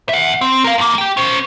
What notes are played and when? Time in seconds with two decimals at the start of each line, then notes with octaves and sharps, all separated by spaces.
0.09 E5 F#5
0.41 C4
0.64 A#4 F5
0.78 E2 A#3
0.98 G4 G5
1.17 C#4 C5